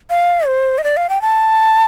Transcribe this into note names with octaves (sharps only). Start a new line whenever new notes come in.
F5
C5
D#5
D5
F5
G5
A5